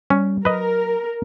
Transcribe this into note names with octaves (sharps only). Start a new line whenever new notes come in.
G3 C#4
F#3 A#4 B4 D#5